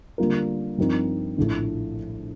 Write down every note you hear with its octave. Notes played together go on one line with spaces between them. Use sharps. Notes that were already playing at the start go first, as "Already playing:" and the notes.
D3 G3 A#3 F4 A#4
G2 F3 C4 D#4 A#4
A#1 A2 A3